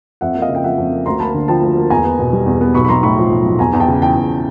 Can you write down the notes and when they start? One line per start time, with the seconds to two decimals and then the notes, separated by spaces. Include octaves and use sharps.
0.21 F2 E5 F#5
0.35 A#3
0.42 D#5 F5
0.49 C#3
0.55 G5
0.64 F3 E5 F#5
0.78 F2
0.92 A#3
1.06 D2 A#5 C6
1.20 A#3 A5 B5
1.34 D3
1.48 F3 G5 A5
1.62 D2
1.77 A#3
1.90 E2 G#5 A#5
2.04 B3
2.19 B2
2.33 G3
2.46 E2
2.61 B3
2.74 B1 B5 C#6
2.85 B5
2.89 B1 A#5 C6
3.03 A2 B5 C#6
3.18 F3
3.31 B1
3.45 B1
3.59 E2 G#5 A#5
3.73 E2
3.80 G5 A5
3.88 C#3
4.02 E3 G5 A5
4.16 E2